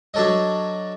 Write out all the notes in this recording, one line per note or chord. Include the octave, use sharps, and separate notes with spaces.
F#3 D4 A4 C#5 D#5